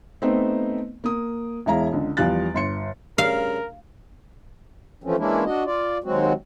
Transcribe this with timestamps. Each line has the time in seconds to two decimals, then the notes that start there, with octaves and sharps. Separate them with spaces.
0.22 A3 B3 C4 D#4 C5
1.04 A#3 D#6
1.66 E1 G#3 E4 F5 A#5
1.93 C#2 D3
2.17 E2 F3 G3 F5 F#6 A6
2.54 G1 C6 C#7
3.18 G2 C#3 A#4 F5
5.04 E3 F3 A3 C4 C#4
5.18 E3 G#3 A#3 C#4 D4 E4
5.45 D4 F#4 D#5
5.65 F4 D5
6.04 D#2 F#3 G#3 C4 F#4